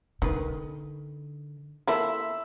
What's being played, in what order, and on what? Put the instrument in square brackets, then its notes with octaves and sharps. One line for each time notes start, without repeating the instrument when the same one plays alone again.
[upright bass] D3 [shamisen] D#3 B4
[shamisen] A#3 E4 A4 [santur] E5 B5 C6